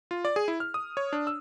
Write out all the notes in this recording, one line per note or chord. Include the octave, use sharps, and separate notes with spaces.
F4
D5
G#4
E4
F6
D#6
C#5
D4
E6